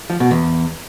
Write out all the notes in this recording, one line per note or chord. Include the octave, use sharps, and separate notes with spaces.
F3
B2
E2